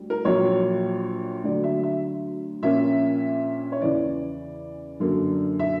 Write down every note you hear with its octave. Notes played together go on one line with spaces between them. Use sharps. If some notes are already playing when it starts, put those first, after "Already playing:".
Already playing: D2 G3
A#4
A#1 A#2 F#3 C#5
D2 D3 F#3 D5
E5
E5
A#1 A#2 A#3 C#4 E5
C#5
E2 C#3 E3 D5
F#2 D3 A#3
E5